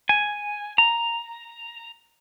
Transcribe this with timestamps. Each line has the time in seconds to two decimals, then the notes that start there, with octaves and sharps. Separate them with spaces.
0.09 G#5
0.78 A#5